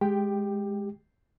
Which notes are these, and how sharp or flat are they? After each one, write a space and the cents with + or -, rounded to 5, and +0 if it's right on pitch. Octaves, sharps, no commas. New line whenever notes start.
G#3 +0 G4 +15 G5 +0